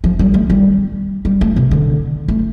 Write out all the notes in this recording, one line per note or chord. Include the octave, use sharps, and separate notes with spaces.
F3
G3
A3
G3
G3
A3
C3
D3
A3